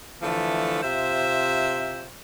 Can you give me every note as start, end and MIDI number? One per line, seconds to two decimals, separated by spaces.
0.22 0.81 50
0.22 0.81 52
0.22 0.81 53
0.22 0.81 57
0.83 2.05 48
0.83 2.05 65
0.83 2.05 72
0.83 2.05 76